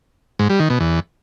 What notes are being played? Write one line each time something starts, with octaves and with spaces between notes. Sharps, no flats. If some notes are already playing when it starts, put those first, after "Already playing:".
G#2
G3
D#3
B2
E2